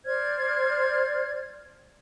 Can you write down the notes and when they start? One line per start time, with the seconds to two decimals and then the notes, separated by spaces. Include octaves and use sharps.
0.05 C5 D5 F6 G#6